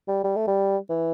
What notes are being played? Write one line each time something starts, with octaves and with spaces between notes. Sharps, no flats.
G3
G3
A3
G3
E3